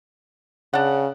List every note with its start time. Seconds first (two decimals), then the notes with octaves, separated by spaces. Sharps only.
0.73 C#3 D4 F#5